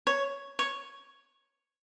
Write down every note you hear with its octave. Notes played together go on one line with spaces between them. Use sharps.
C#5
C#5